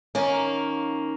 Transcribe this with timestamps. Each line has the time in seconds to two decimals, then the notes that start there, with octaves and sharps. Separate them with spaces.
0.15 D#3 A#3 C#4